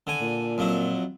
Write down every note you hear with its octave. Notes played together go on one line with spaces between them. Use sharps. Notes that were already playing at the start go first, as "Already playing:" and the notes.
D3 G#5
A#2
F2 F#3 E4